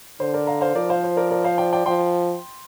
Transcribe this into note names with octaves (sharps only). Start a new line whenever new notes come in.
D3 C5
A#4 D5
F5 A#5
C5 F5
F3 A#4 D5
C5 F5
C5
A#4 D5
A#4 D5
C5 F5
D5 G5
D5 G5
F3 G5 C6